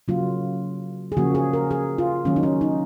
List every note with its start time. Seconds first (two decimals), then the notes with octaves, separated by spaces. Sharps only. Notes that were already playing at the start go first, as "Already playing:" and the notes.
0.08 C#3 F#3 A#3 F4
1.12 G#4
1.17 C#3 F3 A#3 F#4
1.35 G#4
1.53 A#4
1.71 G#4
1.98 F4
2.25 D#3 F#3 A#3 C#4
2.36 D#4
2.43 C#4
2.61 D#4